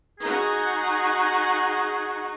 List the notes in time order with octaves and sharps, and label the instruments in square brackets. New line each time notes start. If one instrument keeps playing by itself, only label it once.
[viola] D#4 F#4 [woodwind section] G#4